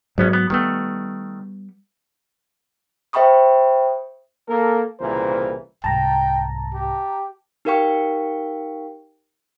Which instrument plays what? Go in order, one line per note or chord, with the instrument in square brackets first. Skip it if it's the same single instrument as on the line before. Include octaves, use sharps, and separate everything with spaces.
[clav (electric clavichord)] A#1 B3 C#4 [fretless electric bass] G#2 F#3
[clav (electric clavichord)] B3
[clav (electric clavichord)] D#3 A3 [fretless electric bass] G3 B3
[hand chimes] C5 E5 G5 B5 C#6 D#6
[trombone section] A#3 A4 A#4
C2 A#2 C#3 E3 A#4 C5
[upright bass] C2 G#2 [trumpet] G5 [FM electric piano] A5 A#5
[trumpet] G4
[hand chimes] D#4 G4 A#4 F5 G5 C#6